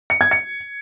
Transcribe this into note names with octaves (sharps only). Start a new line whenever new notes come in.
C#7
G#6
C#7